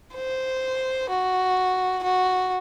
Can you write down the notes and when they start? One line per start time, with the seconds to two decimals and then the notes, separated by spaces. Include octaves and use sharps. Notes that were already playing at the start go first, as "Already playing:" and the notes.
0.15 C5
1.09 F#4
2.03 F#4